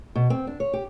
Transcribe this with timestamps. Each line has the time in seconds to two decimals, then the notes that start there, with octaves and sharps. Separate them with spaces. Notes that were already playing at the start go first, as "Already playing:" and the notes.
0.15 B2
0.30 C4
0.47 D4
0.60 C#5
0.73 G4